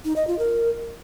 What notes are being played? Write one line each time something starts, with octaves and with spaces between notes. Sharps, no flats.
D#4
D#5
F4
A#4